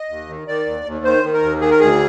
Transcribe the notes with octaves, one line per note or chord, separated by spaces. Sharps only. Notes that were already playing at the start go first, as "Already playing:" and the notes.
Already playing: D#5
D#2
D#3
D#3 D5
D#2
D#2
D#3 C5
D#3
A#4
D#2
D#3 G#4
A#4
D2 G#4